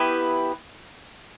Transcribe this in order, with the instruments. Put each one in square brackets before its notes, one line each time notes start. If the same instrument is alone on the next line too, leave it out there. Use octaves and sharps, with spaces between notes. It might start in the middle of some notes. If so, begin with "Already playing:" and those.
Already playing: [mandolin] B3 E4 G4 B4